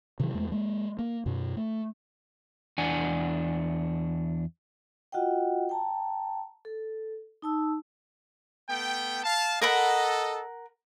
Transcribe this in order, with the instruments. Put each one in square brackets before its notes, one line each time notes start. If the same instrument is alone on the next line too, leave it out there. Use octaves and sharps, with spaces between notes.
[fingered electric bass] C3 D#3 E3 F#3
E2 G#3 A3
G#3 A#3
A#3
F#2 B2
A3
[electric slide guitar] E2 D4 F#5 G#5
[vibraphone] F4 F#4 D#5 F#5 G5
G5 A5 A#5
A4
D#4 A5 E6
[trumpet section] A3 B3 G5
F5 A5
[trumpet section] A4 D#5 [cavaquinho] A#4 F#5 B5